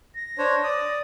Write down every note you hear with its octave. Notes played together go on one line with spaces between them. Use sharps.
A#6
D4 C5 C#5
D5 D#6